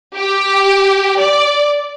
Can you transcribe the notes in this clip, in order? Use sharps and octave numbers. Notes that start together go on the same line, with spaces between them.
G4
D5